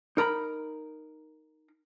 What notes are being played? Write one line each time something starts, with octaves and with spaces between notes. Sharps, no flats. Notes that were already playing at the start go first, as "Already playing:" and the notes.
D#4 A#4 A#5 B5